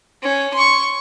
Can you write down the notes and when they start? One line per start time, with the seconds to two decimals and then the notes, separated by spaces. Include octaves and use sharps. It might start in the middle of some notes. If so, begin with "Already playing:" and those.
0.23 C#4
0.54 C6 C#6